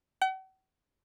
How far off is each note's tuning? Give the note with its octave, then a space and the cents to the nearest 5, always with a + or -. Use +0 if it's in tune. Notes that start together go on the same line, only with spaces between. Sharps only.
F#5 +45